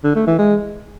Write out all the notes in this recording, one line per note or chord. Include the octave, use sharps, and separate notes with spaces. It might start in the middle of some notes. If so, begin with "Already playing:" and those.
D3
A3
E3
G#3